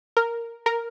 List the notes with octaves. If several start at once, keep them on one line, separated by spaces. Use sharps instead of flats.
A#4
A#4